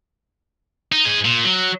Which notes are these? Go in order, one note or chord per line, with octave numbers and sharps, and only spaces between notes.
D#4
G#2 G#4
A#2
F#3